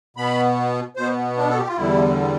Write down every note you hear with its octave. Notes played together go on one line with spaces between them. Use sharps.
B2 B3 B5
B2 B3 C5
D4
A4
G4
F4
E2 D3 G3 E4